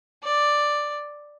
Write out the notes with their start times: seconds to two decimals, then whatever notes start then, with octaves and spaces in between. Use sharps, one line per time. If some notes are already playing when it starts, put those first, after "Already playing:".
0.24 D5